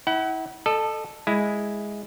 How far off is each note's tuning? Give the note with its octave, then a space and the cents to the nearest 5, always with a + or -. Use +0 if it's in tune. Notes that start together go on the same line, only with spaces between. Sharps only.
E4 -30 F#5 +30
A4 +0 D#5 -35
G#3 +0 E4 +0